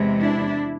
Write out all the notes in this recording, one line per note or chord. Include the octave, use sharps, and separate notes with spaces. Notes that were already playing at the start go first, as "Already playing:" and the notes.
Already playing: E2 C3 E3 G#3
D4 E4